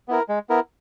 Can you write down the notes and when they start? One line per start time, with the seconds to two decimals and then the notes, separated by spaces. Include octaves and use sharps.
0.08 B3 E4 A#4
0.29 G#3
0.49 B3 E4 A#4